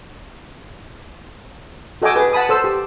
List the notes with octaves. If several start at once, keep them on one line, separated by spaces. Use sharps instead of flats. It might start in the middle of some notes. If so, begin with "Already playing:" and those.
F#4 A4 D#5 G5 G#5 D6
G#4 B4
F#5 A5 B5 D#6
A4 C5 E6
G4